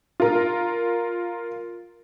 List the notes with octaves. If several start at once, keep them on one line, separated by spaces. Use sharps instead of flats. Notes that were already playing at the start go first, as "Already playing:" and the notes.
F4 A#4